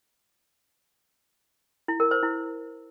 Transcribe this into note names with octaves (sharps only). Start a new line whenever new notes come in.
E4
A#4
C5
E4